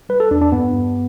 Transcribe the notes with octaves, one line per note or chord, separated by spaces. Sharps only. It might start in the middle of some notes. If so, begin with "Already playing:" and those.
G3 B4
A4
E2 D4
D4
G2 B3
G2